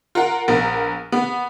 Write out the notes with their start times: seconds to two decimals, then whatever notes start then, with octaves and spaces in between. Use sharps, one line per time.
0.15 F4 A#4 F#5
0.48 A#1 B3 A#4
1.12 B3